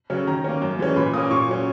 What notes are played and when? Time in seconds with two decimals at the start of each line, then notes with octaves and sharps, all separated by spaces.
0.10 C#3 F#3 C#4
0.27 D#3 A#5
0.44 A#3 C#4
0.62 F#2
0.79 E3 G#3 C#4
0.96 A#2 B5
1.14 A#3 C#4 D#6
1.30 A#2 C#6
1.48 F#3 C#4